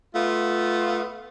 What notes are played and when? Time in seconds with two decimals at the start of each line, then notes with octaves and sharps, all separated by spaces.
0.14 A3 B3 F4